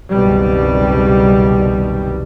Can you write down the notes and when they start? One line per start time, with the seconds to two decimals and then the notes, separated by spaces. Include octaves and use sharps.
0.13 F#1 C2 B2 D#3 G3